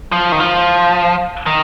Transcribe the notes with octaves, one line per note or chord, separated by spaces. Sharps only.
F3
D#3
F3
D#3